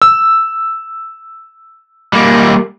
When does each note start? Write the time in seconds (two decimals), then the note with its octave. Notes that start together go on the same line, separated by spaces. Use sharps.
0.02 E6
2.13 G3 A#3